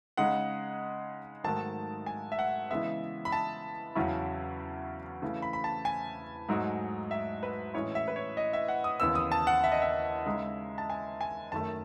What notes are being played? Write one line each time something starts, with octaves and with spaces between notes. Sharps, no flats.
C#3 G#3 D#4 F#5
G#2 D#3 F#3 A3 A5
G#5
E5
F#5
C#3 E3 G#3 B3 E5
B5
A5
E2 C#3 F#3 C#4 E4
C#3 E3 A3
B5
B5
A5
G#5
G#2 F#3 A3 D#4
E5
B4
A2 E3 G#3 C#4 E4 C#5
E5
B4
C#5
D#5
E5
F#5
D#6
D#2 C#3 E3 B3 E6
D#6
A5
F#5
E5
D#5
E5
C#3 G#3 D#4
A5
G#5
G#5
F#2 D#3 A3 A5